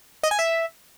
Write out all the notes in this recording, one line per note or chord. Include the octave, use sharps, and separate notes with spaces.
D#5
G#5
E5